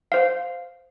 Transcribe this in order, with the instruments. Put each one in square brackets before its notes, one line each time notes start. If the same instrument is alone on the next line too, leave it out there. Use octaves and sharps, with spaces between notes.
[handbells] C5 F5